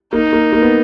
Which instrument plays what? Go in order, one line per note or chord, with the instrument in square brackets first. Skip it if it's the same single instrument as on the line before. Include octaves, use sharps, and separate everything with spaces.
[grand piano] A#3 [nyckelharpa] D#4
[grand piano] A#3
A#3
B3